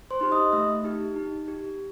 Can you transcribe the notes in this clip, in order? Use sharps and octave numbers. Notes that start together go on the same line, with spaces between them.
C5 C6
D#4 G4
D#5 D#6
A3 E5 E6
D#4 G4
D#4
G4